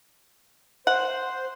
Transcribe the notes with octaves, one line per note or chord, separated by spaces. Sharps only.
C5 F#5